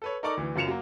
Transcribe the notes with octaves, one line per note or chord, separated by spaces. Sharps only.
A4 B4 C#5
D#4 A4 A#4 D5 C#6 D6
D2 E3
F#1 F#2 F4 C#7 E7 F7
F#3 A#3